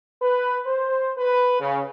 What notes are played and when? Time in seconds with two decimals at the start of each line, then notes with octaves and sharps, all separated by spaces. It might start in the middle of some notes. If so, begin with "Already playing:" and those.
0.21 B4
0.66 C5
1.18 B4
1.61 C#3